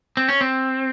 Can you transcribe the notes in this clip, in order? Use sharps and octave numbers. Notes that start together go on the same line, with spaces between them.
C4
C#4
C4